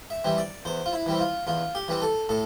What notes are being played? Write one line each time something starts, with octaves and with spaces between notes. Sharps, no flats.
E5
E3 G3 C4
D5
E2 C5
F4
E4
E3 G3 C4
F4
E2 F4
G4
E3 G3 C4
A4
A2 A4